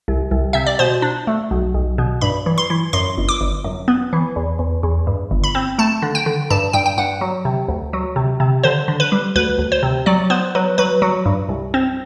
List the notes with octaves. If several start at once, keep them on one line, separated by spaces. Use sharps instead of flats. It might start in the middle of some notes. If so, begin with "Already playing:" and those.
C2
C2
C3 E5
D5
B2 C5
D4
A3
B1
B1
B2
G2 B5
E3
C6
E3
F#2 C6
G1
D6
G1
F#2
B3
E3
E2
E2
E2
G2
G1
B5
C4
A3 A5
D3
G5
D3
G2 A5
G2 G5
G5
G2 F#5
F#3
C3
D2
F#3
C3
C3
D3 C5
D3
B4
G3
D2 B4
D2
C5
C3
F#3 D5
B3 C5
F#3 B4
F#3 B4
F#3
G2
C2
C4